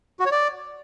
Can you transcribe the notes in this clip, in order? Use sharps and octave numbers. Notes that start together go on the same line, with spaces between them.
F#4
C#5
D5